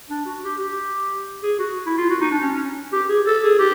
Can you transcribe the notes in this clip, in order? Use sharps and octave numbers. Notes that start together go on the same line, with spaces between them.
D4
F#4
G4
G4
G#4
F#4
E4
F4
F#4
D#4
D4
C#4
C#4
G4
G#4
A4
G#4
G4